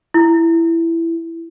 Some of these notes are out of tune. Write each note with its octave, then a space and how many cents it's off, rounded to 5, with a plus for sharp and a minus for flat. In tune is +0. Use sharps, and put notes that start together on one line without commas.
E4 +10